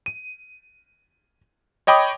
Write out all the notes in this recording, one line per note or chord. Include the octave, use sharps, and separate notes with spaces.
D#7
C#5 D#5 G5 B5 D6 D#6